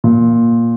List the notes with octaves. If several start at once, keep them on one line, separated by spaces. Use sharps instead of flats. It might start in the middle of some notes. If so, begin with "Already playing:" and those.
A#2